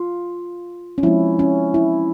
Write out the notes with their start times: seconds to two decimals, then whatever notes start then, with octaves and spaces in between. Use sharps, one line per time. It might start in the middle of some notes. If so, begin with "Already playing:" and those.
Already playing: F4
0.98 C#4
1.03 F3 G#3 C4 E4
1.39 C#4
1.74 E4